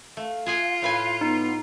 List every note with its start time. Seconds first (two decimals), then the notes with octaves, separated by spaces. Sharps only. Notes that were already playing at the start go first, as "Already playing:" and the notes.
0.17 A3 F5
0.46 F4 G#4 F#5 G#5
0.82 A2 B4 G#5
1.21 B3 D#4